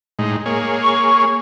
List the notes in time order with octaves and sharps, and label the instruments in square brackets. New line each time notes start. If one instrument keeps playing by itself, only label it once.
[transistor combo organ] A2 G#3 D#4
A#3 G#4 C#5
[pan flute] C#6